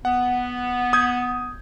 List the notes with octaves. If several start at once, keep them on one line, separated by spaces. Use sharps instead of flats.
B3 F#5
D#6 G6 G#6